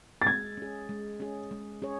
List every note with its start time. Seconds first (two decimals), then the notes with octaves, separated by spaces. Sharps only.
0.22 A6
0.27 G#3 G#6
0.57 C#4 G#4
0.89 G#3
1.20 C#4 G#4
1.51 G#3
1.82 C#4 G#4 C#5